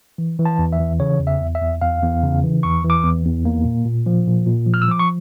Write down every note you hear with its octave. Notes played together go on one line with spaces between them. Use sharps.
E3
E3
A5
E2
E5
E3
C#3 C#5
E2
E5
E2
E5
E2
E2 F5
E2
C#3
E3
E2 C#6
E3
D6
E2
E2
A#3
A#2
A#2
F3
A#2
A#2
F3
F6
E6
F3 D6
C#6